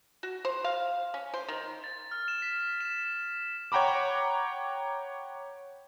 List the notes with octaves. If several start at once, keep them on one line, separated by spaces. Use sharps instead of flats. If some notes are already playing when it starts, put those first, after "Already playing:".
F#4
C5
F5
C#4
C5
D#3
A6
F6
E7
B6
E7
C#5 F#5 G5 A#5 B5 D6